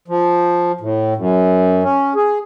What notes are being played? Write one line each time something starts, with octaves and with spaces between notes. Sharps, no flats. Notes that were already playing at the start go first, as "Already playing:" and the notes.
F3
A2
F#2
C#4
G#4